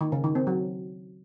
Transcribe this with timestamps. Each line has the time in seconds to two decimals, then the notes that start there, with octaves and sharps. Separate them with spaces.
0.01 D#3
0.12 C#3
0.24 D#3
0.35 C4
0.47 F#3